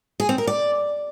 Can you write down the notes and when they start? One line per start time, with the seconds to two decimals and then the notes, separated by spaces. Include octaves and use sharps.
0.20 G#4
0.29 C4
0.38 A#4
0.47 D5